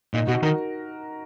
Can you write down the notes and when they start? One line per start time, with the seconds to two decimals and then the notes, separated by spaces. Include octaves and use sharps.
0.14 A#2 D#4
0.28 B2 F#4
0.43 D#3 A#4